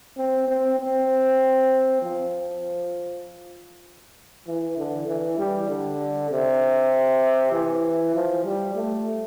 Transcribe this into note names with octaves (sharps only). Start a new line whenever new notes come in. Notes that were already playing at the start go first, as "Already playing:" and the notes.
C4
C4
C4
F3
E3
D3
E3
G3
D3
C3
E3
F3
G3
A3